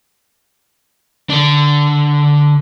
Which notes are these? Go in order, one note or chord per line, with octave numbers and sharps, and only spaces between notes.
D3 D4